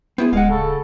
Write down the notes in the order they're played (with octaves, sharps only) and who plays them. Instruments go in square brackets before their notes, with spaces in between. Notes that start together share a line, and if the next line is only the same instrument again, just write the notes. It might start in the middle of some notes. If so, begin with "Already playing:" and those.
[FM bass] B3 [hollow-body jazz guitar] C4 E4 G#4
[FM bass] D1 [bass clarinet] G#3 [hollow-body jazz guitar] F5 F#5
[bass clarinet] C#3 [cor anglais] A4